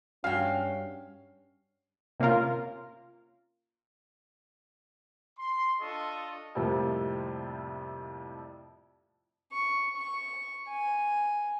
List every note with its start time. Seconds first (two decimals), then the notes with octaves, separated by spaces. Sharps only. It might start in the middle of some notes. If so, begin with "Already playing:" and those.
0.24 G2 C#4 F#4 E5 F5 G5 G#5
2.20 C3 A#3 C#4 F4 A#4
5.39 C6
5.80 D4 F4 A4 D#5 C#6
6.55 F2 A2 C3 F3 G3 A#3
9.52 C#6
9.97 C#6
10.68 G#5